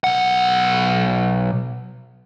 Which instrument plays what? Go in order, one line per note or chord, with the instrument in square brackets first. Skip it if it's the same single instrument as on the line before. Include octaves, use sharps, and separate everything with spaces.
[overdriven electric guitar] B1 F#5